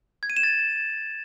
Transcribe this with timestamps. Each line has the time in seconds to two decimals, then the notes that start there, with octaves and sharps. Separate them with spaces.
0.23 G#6
0.30 D#7
0.37 E7
0.43 A6